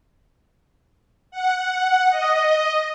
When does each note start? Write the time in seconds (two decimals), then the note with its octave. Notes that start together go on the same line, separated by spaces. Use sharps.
1.31 F#5
2.09 D#5